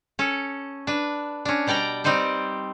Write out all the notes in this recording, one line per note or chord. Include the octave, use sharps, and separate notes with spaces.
C#4 A4
D4 B4
C#4 D4
B2 G3 D5 G5 A#5
G3 C4 D#4 C5 D5